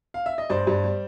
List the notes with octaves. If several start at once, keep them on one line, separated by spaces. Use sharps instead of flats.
F5
E5
D#5
G2 C5 D5
G2
G3